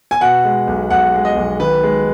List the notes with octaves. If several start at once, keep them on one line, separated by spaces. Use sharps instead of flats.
G#5
B2 F#5
G#3
B1
B1 F#5
G#3
D#5
B1
D#3 B4
G#3